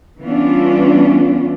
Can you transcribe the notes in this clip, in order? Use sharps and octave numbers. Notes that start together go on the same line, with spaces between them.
E3 G3 B3 C#4 D4 F4